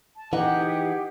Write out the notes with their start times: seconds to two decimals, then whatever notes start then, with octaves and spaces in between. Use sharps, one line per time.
0.16 A5
0.33 E3 D#4 G4 G#4 F#5